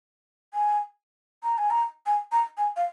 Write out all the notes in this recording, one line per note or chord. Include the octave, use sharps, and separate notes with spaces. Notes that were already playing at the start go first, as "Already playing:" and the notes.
G#5
A#5
G#5
A#5
G#5
A#5
G#5
F5